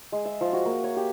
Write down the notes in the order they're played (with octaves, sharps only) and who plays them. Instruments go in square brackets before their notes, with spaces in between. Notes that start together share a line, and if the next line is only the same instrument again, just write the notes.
[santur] G#3
E5
F3
F#4
A#3
C#5
G4